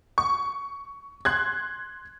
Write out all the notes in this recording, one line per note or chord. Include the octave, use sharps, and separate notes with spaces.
C#6
C6 F#6 G#6